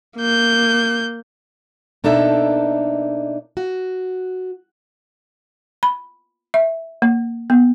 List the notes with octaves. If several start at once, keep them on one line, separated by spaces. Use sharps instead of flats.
A#3 G6
B2 A#3 D4 D#4 A4 E5
F#4
B5
E5
A#3
B3